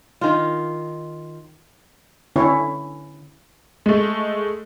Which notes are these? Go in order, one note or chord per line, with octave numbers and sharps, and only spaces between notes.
D#3 F4
D3 C#4 E4 C#5
G#3 A3